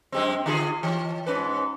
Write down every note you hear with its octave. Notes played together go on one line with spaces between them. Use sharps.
F#2 G#3 C4
D3 F4 G#4
E3
G#2 C#4 B4